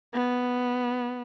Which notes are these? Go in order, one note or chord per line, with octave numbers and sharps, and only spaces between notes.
B3